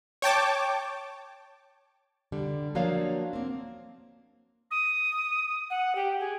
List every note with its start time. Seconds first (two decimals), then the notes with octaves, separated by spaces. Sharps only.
0.22 C#5 G5 A5 D6
2.32 D3 G3
2.75 F3 F#3 A#3 D4 C#5 F5
3.33 A#3 C4
4.71 D#6
5.70 F#5
5.95 G4
6.20 G#4